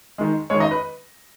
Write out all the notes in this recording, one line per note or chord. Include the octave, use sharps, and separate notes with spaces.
D#3 G#3
D#3 G#3 C#5
D#5
B4